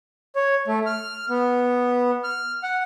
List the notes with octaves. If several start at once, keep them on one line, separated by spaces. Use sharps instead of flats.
C#5
A3
F6
B3
F6
F#5